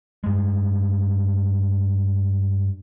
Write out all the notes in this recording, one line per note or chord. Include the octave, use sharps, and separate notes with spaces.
G2 G#3